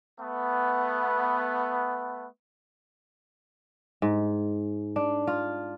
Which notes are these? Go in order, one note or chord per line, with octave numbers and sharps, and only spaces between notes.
A3 B3
G#2
D4
F4